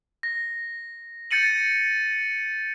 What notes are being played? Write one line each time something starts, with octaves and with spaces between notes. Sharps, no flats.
A#6
G6 A6 C#7 D#7 F#7